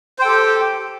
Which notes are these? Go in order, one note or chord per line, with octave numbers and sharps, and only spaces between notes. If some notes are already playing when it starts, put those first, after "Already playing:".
G4 A4 C5 G5